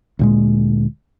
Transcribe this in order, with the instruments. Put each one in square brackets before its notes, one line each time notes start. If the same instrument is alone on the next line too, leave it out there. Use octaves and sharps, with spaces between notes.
[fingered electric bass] D2 A#2 G#3